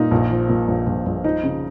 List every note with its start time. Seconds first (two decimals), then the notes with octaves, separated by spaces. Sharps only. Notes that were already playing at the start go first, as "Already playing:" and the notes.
Already playing: A#2 D#4
0.11 A#1
0.30 F3
0.49 A#2
0.68 A#1
0.87 A#1
1.06 A#1
1.24 F3 D#4
1.44 C#3